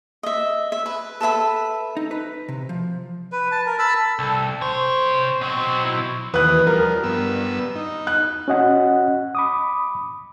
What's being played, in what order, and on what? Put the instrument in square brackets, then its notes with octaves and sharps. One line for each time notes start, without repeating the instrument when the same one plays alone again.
[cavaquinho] D#5 E5
E5
B4
A4 B4 E5 B5
[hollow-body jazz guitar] D#4
B4
C3
F3
[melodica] B4
A5
A#4
A5 B5 E6
[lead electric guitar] C2 [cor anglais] A4
[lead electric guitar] C3 C#5 [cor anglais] C5
[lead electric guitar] B2 F#3 [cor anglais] C4
[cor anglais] E4
[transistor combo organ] D#2 E3 D#6 [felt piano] B4 F#6
[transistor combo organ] F3 G3 [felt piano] A#4
[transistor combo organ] G2 B3 E6
D#4
[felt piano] F#6
[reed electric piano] C#4 F#4 D#5 F#5
B5 D6 D#6